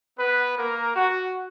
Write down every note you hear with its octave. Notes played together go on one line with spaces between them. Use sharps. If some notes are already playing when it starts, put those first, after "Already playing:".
B3 B4
A#3 A#4
F#4